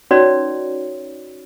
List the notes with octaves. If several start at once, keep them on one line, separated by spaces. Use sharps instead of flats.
C#4 D#4 F#4 B4 C#5 D5